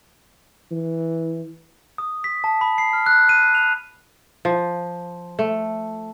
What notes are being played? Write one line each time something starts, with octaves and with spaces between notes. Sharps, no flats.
E3
D#6
B6
A5
B5
C7
F6
F#6
D#7
F7
F3
A3